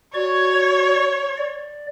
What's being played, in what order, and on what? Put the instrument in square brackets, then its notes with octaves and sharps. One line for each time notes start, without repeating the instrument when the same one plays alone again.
[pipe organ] F#4 D5 C#6 [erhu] C#5
[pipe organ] D5